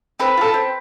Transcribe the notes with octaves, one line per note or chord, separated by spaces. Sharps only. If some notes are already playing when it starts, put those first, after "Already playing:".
C4 B4
F4 A4
C4